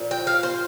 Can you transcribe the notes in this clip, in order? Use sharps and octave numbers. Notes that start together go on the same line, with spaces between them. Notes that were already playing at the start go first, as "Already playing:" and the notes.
Already playing: A#2 F3
G5
F5
C5